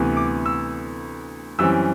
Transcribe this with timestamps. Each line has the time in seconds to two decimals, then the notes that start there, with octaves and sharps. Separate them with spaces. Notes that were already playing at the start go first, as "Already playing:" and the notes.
Already playing: D2 C3 E3 B3
0.17 D6
0.46 E6
1.59 F#2 E3 G3 C4 E6